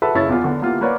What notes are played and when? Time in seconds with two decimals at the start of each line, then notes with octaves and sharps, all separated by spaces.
0.02 F#4 A4 B4 E5 A5 B5
0.15 F#1 C#3 E4 C#5 A6
0.29 E2 B3 F4
0.44 D3 B3 D4
0.62 A#3 B3 E4 F4 G4
0.81 A#3 A#4 B4 C#5 D5 F#5